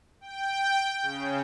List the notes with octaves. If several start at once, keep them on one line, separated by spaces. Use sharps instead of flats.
G5
C#3